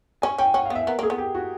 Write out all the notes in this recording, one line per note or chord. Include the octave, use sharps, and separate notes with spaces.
C#4 G#5
C#4 G5
C#4 F#5
B3 F5
E5
B3 A#4
A#3 G#4
B3
G4
F#4